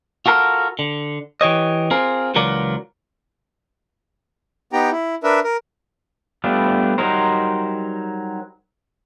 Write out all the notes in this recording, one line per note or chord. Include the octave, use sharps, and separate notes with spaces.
F4 F#4 A4 A#4
D3
E3 G4 C#5 D#5
C4 F4 G#4 A#4
C#2 E3 F#3 F4 A#4 D5
B3 D#4 G4 G5 A#5
E4
D4 A#4 B4 E5
A#4
G3 A3 B3 D4 F4
F#3 G3 D#4 A#4 C5